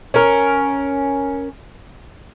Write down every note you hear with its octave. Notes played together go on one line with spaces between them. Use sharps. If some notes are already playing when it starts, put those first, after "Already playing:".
C#4 A#4